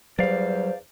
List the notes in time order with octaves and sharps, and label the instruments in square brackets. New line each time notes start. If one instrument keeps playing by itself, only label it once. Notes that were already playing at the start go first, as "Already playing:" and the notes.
[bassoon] E2 [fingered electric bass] F#3 G3 [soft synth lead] C5 [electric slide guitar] D5 F5